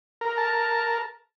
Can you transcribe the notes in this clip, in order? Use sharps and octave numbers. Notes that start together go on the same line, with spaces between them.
A#4
A5